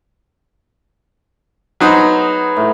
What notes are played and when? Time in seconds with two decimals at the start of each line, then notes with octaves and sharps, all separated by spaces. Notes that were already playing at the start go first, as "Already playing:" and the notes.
1.80 F#3 B3 D#4 G#4 C5
2.57 A2